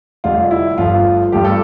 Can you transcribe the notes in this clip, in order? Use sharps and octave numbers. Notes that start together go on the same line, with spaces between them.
F1 F2 D3 G3 F4
E4
G1 G2 F3 A3 F4
G1 G2 F3 A3 G4
A4